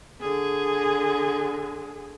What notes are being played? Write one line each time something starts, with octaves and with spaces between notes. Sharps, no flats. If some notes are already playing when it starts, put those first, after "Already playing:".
D3 G#4